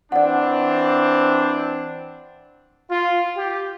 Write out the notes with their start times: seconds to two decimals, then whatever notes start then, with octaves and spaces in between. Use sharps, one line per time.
0.12 E3 C4 D4 D5 F#5
2.90 F4
3.36 G4